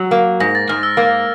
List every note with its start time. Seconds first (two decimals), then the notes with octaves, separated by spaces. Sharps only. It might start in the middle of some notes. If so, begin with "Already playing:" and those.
Already playing: F#3
0.11 A#3
0.40 G#2 A#6
0.55 A6
0.69 G#2 F6
0.83 E6
0.97 A#3